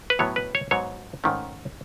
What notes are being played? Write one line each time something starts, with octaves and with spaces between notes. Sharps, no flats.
B4
A2 F#3 B3 C#5
B4
C#5
G#2 F#3 B3 C#5
G#2 D#3 A3 C#4